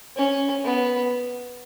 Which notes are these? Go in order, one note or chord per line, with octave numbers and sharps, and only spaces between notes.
C#4
B3